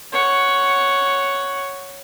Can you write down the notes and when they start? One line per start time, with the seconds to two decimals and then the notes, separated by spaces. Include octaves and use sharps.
0.12 C#5 F#5